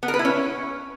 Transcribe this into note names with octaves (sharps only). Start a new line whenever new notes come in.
B3
A#4
B4
E4
C#4